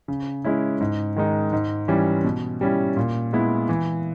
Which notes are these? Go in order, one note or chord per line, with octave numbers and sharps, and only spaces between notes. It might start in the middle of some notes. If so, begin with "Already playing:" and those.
C#3
G#3 C#4 E4
G#2
D#3 G#3 D#4
G#2
E3 G3 C#4 E4
B2
G3 C#4 E4
A#2
G#3 B3 E4
E3